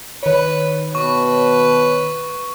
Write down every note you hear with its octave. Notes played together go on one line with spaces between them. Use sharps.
D#3 B4 C#5
B2 B4 C#6